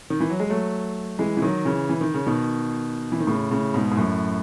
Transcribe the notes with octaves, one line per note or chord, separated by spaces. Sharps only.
D#3
E3
F#3
G#3
F#3 A3
E3 G#3
E3
D#3 F#3
C#3 E3
E3
D#3
C#3
B2 D#3
E3
D#3
A2 C#3
A2 C#3
G#2 B2
G#2
F#2 A2